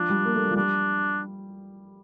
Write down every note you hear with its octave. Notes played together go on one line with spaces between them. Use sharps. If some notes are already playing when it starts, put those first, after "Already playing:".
Already playing: F3 D4
G3
A#3
A3
G3
F3
G3 D4